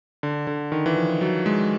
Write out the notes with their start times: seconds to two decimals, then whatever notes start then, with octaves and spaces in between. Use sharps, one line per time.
0.23 D3
0.47 D3
0.72 D#3
0.86 E3
0.96 F3
1.21 F#3
1.46 G#3